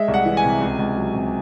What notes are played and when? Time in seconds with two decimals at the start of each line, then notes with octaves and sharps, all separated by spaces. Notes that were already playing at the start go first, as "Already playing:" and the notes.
Already playing: G#3 E5
0.08 C2
0.14 F#5
0.25 E3
0.37 G#5
0.43 C3
0.61 C#2
0.79 C#2
0.97 F#3
1.14 C3